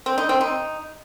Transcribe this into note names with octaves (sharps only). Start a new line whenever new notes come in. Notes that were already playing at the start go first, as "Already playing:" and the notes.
C4
D#4
C4
D#4